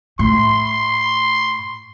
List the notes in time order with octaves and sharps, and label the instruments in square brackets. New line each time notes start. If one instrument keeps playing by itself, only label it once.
[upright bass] A2 [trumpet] C6